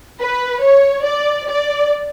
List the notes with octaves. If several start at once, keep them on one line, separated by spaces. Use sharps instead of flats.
B4
C#5
D5
D5